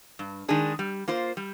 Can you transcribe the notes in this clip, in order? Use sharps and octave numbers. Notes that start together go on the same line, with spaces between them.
G2
D#3 G#3 D4 G#4
G3
A#3 F4 C5
G3